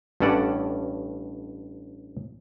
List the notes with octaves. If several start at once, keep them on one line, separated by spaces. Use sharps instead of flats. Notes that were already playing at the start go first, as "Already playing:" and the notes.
A1 G2 C#4 A4 D5 F#5